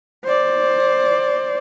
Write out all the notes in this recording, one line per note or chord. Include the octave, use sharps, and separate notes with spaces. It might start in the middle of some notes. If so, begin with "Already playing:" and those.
C5 D5